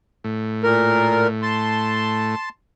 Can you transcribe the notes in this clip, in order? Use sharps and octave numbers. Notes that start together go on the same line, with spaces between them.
A2
A#2 A#4
A5 C6